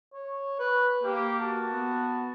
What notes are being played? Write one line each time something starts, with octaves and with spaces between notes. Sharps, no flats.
C#5
B4
A#3 G4
F#4 A5
B3